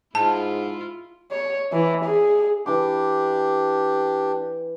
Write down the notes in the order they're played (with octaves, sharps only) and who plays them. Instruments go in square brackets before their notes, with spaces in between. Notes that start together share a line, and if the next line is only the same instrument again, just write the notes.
[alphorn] G#2 [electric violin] E4 F4 [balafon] A5
[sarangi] C#5
E3
G#4
[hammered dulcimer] E3 D6 [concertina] D4 G4